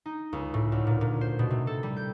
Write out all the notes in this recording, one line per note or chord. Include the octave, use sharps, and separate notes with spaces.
D#4
C#2
A2
D2
A#2
A#2
C5
B2
C3
A4
G3
G6